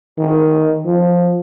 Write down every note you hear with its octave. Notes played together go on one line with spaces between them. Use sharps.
D#3
F3